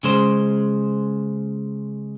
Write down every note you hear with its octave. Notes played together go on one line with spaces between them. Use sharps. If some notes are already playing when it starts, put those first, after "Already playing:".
C#3 G#3 C5